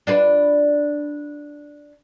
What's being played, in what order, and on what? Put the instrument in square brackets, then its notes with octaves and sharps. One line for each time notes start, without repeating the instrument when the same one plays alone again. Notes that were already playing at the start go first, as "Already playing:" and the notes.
[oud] D4 F4 B4